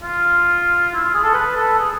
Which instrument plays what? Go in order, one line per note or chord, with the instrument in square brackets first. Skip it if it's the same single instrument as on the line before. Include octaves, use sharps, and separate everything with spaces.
[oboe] F4
E4
F4
G#4
A4
B4
A4
G#4